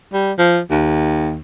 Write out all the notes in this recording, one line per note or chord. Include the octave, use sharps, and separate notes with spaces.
G3
F3
D#2